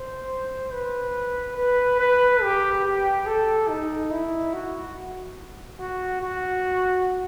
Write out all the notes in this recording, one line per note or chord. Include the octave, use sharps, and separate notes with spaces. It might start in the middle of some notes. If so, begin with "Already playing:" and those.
Already playing: C5
B4
B4
B4
G4
G4
A4
D#4
E4
F#4
F#4
F#4